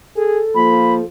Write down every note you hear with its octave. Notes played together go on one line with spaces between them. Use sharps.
G#4 A4
F3 A#3 B5